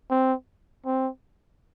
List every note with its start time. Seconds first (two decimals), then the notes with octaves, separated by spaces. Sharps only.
0.11 C4
0.86 C4